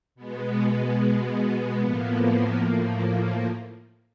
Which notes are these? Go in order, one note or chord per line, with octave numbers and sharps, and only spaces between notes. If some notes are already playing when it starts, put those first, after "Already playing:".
B2 G#3 B3
A2 F3 A#3